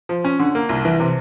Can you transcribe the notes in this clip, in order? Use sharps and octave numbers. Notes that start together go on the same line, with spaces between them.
F3
C#4
D3
A#3
C2
E3
C3